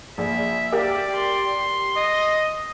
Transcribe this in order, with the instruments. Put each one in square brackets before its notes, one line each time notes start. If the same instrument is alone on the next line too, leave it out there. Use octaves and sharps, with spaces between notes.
[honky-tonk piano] A#1 [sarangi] E5
[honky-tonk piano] G4 A#4 G5 [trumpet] D5
[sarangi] C6
[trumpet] D#5